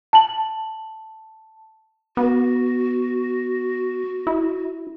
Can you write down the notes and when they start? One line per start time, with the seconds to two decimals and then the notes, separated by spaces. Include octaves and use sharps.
0.13 A5 F#7
2.17 B3 F#4
4.27 E4